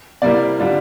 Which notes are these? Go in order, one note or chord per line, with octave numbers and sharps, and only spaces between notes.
C3 G3 A#3 E4 D5
D3 G3 D4 F4